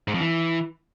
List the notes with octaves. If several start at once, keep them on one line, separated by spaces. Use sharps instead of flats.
G#2
F2
E3